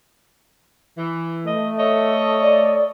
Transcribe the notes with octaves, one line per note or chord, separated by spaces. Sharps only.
E3
A3 D#5
A4 C#5 D#5
D5